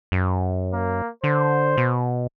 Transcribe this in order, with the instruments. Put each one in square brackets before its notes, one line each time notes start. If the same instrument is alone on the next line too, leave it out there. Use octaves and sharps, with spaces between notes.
[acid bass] F#2
[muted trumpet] A#3
[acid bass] D3 [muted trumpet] C5
[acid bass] B2